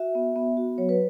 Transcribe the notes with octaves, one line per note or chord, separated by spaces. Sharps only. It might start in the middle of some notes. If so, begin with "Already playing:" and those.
Already playing: F#4 E5
B3
B3
F#4
F#3 C#5
B4